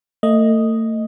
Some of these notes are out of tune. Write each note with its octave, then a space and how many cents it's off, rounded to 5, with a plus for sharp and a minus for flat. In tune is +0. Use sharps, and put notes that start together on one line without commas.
A3 +35 D#5 +0